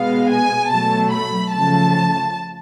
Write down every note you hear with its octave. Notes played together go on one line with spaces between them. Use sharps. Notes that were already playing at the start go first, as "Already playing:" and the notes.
Already playing: B2 G#3 B3 F5
G#5
B2 F#3 A3 A5
B5
C#3 F3 A3 A5